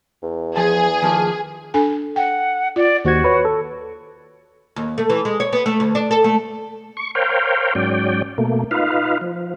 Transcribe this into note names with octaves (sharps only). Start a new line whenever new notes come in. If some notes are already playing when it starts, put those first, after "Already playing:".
E2
F3 G#4 A5
D#3 F3 A#3
D4 A4 G#5
F#5 G5
F4 D5
D#2 F#4 C5 G#6
B4 C#5
A4
D#2
A3
E3
G#3
C#5
B3
A3
D2
D4
A4
A3
C#6
A#4 C5 C#5 F5 G5
G#2 F#3 C#4 D5 G5
B2 A3 A#3
D#4 F4 B4 F5
F3